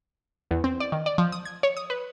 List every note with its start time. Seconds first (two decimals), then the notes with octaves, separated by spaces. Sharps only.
0.51 E2
0.64 C4
0.80 D5
0.92 D#3
1.06 D5
1.18 F3
1.32 D#6
1.45 G#6
1.63 C#5
1.77 D#6
1.90 B4